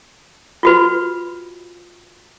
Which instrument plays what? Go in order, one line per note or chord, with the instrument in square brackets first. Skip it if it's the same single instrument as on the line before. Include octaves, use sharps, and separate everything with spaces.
[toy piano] F4 F#4 B4